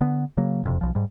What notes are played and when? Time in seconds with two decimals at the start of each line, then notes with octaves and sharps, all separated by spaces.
0.01 D3 B3
0.37 C#3 F#3 A#3
0.63 E1 F2 C3
0.81 B1 F3
0.95 G#2 G3